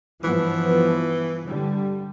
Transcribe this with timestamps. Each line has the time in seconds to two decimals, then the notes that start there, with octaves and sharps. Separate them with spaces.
0.24 G2 E3 F3 B3
1.46 D3 G3